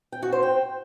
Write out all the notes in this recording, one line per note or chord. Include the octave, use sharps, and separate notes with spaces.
G5
F#4
C5
G5